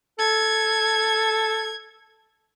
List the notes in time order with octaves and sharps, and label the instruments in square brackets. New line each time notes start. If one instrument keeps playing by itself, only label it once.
[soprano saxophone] A4 [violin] G#6